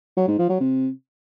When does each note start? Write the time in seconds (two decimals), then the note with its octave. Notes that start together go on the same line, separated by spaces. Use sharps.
0.17 F#3
0.28 G#2
0.39 F3
0.49 F#3
0.60 C3